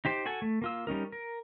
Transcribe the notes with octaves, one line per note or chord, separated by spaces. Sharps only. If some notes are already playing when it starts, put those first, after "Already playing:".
D#4 G4 C5
F#4 A4 G#5
A3
A#3 F4 E6
G3 C#4 D#4 A#4
A#4